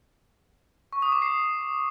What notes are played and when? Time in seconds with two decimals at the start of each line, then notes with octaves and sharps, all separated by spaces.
0.93 C#6
1.02 D#6
1.12 D6
1.22 C7